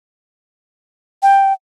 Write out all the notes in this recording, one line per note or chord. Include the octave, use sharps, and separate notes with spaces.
G5